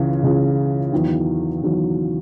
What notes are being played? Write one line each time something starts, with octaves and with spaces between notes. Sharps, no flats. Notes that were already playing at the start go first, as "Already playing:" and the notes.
Already playing: C#2 C#3 E3
C#2 C#3 E3
E2 D#3 F#3
E2 D#3 F#3